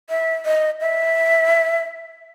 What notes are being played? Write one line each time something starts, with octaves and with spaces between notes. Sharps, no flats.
E5
D#5
E5